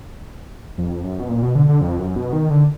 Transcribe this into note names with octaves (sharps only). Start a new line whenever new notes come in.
F2
F#2
B2
A#2
B2
D3
D3
F2
F#2
B2
D#3
D3